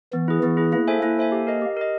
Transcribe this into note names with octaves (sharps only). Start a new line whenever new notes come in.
E3 B3
E4 G#4
E3 B3
E4 G#4
A#3 E4
A4 C5 E5 G#5
A#3 E4
A4 C5 E5 G#5
G4
A#4 D#5
G4
A#4 D#5